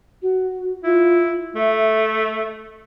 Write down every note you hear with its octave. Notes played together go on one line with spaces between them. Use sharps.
F#4
E4 F4
A3 E5